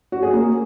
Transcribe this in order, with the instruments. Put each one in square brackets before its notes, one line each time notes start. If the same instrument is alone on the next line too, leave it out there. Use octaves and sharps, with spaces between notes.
[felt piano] F#4
G#4
A#3